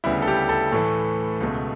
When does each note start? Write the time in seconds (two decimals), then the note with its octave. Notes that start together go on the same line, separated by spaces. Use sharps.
0.04 D2 C#3 G3 B3 E4
0.22 A4
0.27 G4
0.49 A4
0.72 A2 E3 A3
1.41 C#2 B2 A3